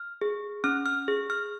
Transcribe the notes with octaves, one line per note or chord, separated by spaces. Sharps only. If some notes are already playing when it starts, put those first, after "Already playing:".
Already playing: F6
G#4
C#4 F6
F6
G#4
F6